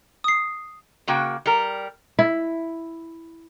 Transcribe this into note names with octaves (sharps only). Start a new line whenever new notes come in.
D#6 C7
C#3 A#3 F#4 G5
G3 A#4
E4